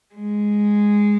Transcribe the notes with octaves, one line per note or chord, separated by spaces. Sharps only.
G#3